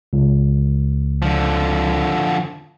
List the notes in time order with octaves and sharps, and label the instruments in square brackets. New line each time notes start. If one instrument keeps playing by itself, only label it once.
[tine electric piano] C#2
[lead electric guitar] D3 F3